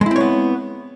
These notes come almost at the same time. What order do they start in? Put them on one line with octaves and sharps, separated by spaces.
G#3 E4 C4 C#5 B3